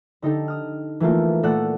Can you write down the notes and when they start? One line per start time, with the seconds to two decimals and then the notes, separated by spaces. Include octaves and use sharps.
0.22 D3 D#4 G4 A4
0.48 D#6 F6
1.00 E3 A3 A#3 F4
1.43 A#2 A3 A4 D5 F#5 F#6